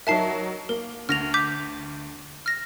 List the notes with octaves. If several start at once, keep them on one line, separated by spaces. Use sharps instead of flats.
F#3 D#4 A#4 E5 A5 C7
A#3 A#4
D2 F6 A#6 F7
D6 G6 B6
F6 A#6